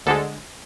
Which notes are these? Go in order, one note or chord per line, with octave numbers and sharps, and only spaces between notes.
D2 D3 G#3 A4